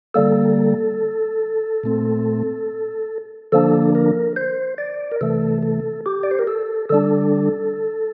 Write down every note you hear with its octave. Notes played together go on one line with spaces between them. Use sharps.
D3 G3 A#3 A4
A#2 A3 C4
D3 F3 A#3 D4 A4
A#4
C5
D5
A#4
C3 E3 A3 A4
A4
G4
D5
C5
A#4
A4
D3 G3 D4 A4